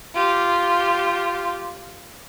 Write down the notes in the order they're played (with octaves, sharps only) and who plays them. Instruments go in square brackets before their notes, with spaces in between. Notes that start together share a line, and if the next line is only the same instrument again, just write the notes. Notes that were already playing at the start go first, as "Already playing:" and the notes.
[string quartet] F4 G4